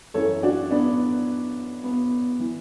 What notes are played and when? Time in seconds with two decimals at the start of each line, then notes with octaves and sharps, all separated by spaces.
0.14 F#2 E3 A4 C#5
0.43 D4 F#4
0.71 B3 D4
1.84 B3
2.40 E3